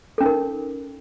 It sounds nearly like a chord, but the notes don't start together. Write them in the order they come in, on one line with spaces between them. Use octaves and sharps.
A4 C#4 D#4 A#4